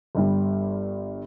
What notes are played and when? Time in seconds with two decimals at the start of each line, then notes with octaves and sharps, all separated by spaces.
0.15 G1 G2 G3